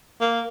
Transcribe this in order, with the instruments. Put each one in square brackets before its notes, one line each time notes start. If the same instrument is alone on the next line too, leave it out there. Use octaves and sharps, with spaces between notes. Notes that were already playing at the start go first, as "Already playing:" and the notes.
[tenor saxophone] A#3